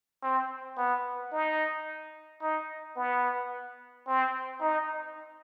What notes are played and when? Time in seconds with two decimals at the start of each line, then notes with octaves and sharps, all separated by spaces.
0.23 C4
0.78 B3
1.32 D#4
2.42 D#4
2.97 B3
4.07 C4
4.61 D#4